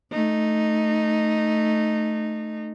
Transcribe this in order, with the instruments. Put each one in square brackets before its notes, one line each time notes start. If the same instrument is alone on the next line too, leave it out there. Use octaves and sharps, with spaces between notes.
[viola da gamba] A3 D#4